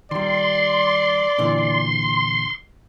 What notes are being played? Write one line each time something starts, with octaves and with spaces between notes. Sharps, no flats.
D#3 G3 D5 C6
A#2 D3 E3